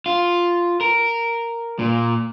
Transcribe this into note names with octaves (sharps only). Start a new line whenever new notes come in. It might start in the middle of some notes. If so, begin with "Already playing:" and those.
F4
A#4
A#2